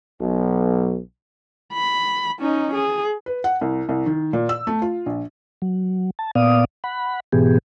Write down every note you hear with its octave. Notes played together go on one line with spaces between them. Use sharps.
B1
B5
C#4 D#4
G#4
B4
F#5
C2
C2
D#3
A#2
E6
A3
F4
A#1
F#3
A5
A#2 B3 D5 F5 D#6
F#5 B5
G#2 B2 E3 B3 G4 G#4